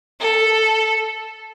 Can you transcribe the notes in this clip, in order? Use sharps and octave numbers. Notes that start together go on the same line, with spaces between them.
A4